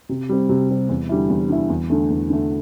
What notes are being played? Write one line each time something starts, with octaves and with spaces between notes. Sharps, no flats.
C3
G3 C4
C3
G3 C4
E2
D3 G3 E4
E2
D3 G3 E4
E2
D3 A3
E2
D3 A3